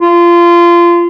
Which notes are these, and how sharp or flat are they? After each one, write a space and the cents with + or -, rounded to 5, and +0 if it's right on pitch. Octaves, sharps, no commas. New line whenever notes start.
F4 -20